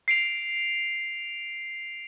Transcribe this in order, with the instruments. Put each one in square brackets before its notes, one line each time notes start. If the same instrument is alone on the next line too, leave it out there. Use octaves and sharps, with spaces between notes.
[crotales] C7 D7 F7